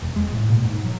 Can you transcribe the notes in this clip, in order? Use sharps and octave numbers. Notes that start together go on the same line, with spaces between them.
E1
G#3
A2
A#2
G#2
F#3